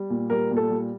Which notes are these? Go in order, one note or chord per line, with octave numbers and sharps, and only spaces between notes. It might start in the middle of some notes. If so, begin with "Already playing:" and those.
Already playing: G3
A#2
G3 A#4
A#2
A4
G3